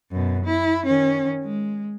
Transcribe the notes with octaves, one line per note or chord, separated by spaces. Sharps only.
F#2 B2
E4
D#3 C#4
G#3